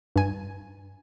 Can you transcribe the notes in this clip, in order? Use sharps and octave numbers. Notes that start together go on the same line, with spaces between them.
G2 G#5